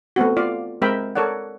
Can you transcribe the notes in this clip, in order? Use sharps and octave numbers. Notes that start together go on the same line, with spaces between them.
A3 B3 C4 F#4
F4 D5 F5
G#3 C4 A#4 E5 G5 B5
A4 A#4 C#5 D5 F#5